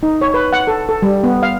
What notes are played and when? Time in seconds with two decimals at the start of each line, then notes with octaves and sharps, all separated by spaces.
0.03 D#4
0.21 C#5
0.34 B4
0.53 F#5
0.67 A4
0.89 A4
1.02 G3
1.24 B3
1.43 F5